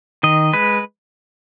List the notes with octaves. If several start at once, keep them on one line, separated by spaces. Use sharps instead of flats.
D#3 D#5
G#3 B4